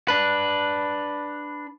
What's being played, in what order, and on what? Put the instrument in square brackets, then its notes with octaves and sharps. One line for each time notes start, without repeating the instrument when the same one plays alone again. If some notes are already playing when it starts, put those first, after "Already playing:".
[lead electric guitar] D4 B4